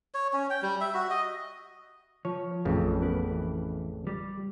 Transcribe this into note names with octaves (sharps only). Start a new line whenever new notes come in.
C#5
C#4
G5
G3
E5
F#4
D#5
F3 C#5
A1 F2 C#3
B3 A#4 B4
E3
G3